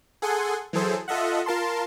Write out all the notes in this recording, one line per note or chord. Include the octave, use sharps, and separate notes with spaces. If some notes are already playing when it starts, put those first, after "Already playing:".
G#4 A4 F#5 G#5 C6
E3 F#3 G#4 A4 C5
F4 A4 D#5 E5 F#5
F4 A#4 A5 C6